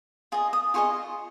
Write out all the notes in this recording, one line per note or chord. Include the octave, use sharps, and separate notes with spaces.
F4 G#4 D#5
D#6
F4 G#4 D#5 C#6